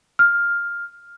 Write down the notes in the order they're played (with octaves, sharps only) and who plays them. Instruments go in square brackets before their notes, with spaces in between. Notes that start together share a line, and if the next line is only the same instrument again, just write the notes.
[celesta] F6